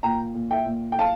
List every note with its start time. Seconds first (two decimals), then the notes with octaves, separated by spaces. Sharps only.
0.03 A#2 G5 A#5
0.34 A#2
0.51 E5 G5
0.66 A#2
0.92 G5
0.99 F5 A5